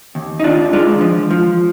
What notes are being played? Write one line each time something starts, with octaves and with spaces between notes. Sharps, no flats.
D#2
D#4
D#2 D4 F4
G#3 D4 F4
F3
F3